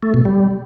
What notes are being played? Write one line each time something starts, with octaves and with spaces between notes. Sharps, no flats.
A3
B2
G3